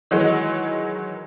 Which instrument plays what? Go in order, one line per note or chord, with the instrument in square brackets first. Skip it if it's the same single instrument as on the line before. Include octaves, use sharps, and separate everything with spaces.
[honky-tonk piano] D#3 E3 F#3 G#3